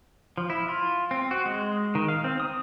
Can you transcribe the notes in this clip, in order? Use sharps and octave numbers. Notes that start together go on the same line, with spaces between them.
F3
E4
F4
C4
F#4
G#3
D#3
F5
C4
D#6